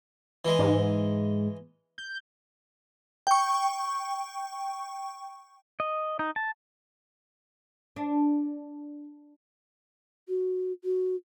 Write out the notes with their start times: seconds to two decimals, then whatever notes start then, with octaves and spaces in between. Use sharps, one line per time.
0.45 E3 G#3
0.59 G#2
1.98 G6
3.27 G5 C#6
5.80 D#5
6.19 D#4
6.36 A5
7.96 D4
10.28 F#4
10.84 F#4